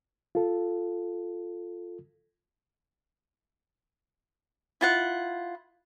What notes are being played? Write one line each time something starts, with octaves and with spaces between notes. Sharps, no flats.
F4 A4
E4 F4 F#5